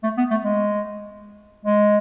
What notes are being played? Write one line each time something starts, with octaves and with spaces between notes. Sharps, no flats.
A3
B3
A3
G#3
G#3